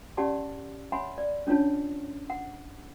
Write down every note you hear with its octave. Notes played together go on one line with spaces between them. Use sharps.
C#4 G4 D5 F#5 A5 C6
C#5 E5 F#5 G#5 B5 C6
D5
C#4 D4 F4 C#5 A5
F#5